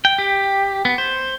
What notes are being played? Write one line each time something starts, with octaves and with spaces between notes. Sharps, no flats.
G5
G4
B3
C5